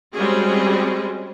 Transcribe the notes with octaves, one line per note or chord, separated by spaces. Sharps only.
G3 G#3 C4 C#4 F#4 G#4